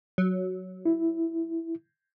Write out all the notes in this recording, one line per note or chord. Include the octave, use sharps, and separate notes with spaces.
F#3
E4